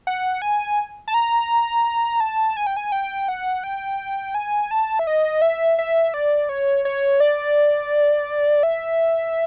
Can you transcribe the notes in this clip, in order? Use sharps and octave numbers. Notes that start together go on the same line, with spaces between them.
F#5
G#5
A5
A#5
A5
G#5
G5
G#5
G5
F#5
G5
G#5
A5
E5
D#5
E5
E5
D5
C#5
C#5
D5
E5